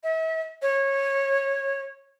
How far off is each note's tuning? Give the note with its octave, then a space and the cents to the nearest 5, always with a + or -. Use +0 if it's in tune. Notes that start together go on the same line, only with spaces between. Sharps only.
E5 -40
C#5 -15